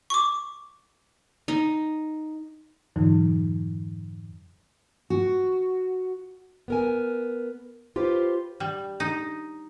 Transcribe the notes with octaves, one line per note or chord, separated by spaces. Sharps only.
C#6 D6
D#4
F2 G#2 D3 E3 F#3 D#4
F#4
B3 A#4 G#5
F4 G4 B4 C5
G3
D#4